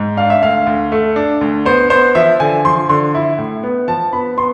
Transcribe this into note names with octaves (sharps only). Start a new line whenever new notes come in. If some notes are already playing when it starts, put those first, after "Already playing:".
Already playing: G#2
D4 F5
E5
D2 F5
D2
A3
D4
D2
B3 C5
B3 C5
F3 E5
D3 G#5
F3 C6
D3 C6
E4
A2
B3
F3 A5
B3 B5
B3 C6